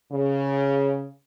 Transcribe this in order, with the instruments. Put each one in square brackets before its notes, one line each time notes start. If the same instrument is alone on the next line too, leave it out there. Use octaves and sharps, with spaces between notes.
[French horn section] C#3